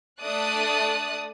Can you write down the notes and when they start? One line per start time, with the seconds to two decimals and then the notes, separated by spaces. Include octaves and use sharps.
0.22 A3 D4 D5 D#6 F#6